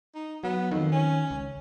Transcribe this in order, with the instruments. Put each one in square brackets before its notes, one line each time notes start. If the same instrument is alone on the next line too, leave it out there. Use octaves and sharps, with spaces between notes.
[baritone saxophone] D#4
[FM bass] F#3 [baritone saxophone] B3
[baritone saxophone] F2 [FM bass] D#3
[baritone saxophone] C#4
[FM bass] C#2